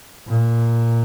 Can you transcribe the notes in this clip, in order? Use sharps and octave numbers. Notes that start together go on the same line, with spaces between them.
A#2